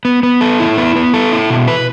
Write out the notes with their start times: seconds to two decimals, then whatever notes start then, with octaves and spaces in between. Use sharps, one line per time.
0.05 B3
0.23 B3
0.41 A4
0.60 E4
0.77 B3
0.96 B3
1.14 A4
1.32 E4
1.50 B2
1.68 B4